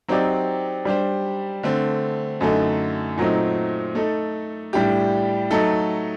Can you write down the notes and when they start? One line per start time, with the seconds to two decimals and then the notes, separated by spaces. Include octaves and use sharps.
0.08 F#3 C4 D#4 G4 D5
0.85 G3 D4 G4 C5
1.63 D3 A3 C4
2.41 F#2 D3 A3 D#4
3.18 A#2 F#3 A3 C4 D#4
3.95 A3 D#4 A4
4.73 A2 G3 D4 G4
5.51 F#3 A3 D#4 A4